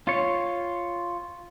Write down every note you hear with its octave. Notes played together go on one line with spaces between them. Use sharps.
F4 C#5